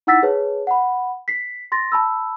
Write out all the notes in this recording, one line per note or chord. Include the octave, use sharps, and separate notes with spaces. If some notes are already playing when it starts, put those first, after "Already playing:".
D#4 E4 F#5 E6 A6 B6
G#4 B4 C#5 A5
F#5 B5
B6 C7
C6 A6 A#6
A5 B5 E6